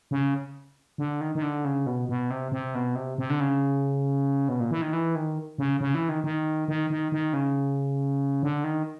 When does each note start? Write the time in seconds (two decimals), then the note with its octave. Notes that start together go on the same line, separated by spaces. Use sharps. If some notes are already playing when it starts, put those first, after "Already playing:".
0.11 C#3
0.98 D3
1.21 D#3
1.35 D#3
1.42 D3
1.65 C#3
1.86 B2
2.09 B2
2.30 C3
2.52 C3
2.75 B2
2.95 C3
3.18 C3
3.30 D3
3.40 C#3
4.49 B2
4.60 A#2
4.71 E3
4.82 D#3
4.93 E3
5.15 D#3
5.58 C#3
5.81 C#3
5.95 E3
6.09 D#3
6.24 D#3
6.68 D#3
6.90 D#3
7.12 D#3
7.33 C#3
8.43 D3
8.64 D#3